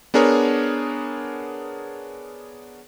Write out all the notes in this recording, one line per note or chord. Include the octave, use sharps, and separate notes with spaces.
B3 D4 G#4 A#4 C#5